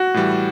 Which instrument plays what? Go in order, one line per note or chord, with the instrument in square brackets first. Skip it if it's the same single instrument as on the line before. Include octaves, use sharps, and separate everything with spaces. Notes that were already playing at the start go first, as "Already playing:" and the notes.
Already playing: [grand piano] F#4
[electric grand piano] A2 E3 G3